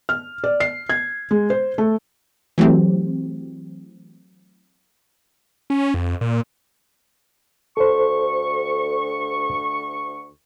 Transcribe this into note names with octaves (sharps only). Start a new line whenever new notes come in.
F6
D5
C7
G#6
G#3
C5
A3
E3 F#3 A3 C4 G4
C#4
F2
A#2
D2 A4 C5 C#6